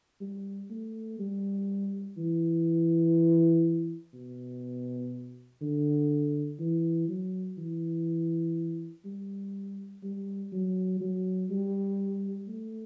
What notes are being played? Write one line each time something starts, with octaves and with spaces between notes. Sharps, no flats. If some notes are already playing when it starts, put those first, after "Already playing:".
G3
A3
G3
E3
B2
D3
E3
F#3
E3
G3
G3
F#3
F#3
G3
A3